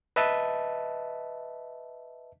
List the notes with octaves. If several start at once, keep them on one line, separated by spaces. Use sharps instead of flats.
B4 D#5 E5 A5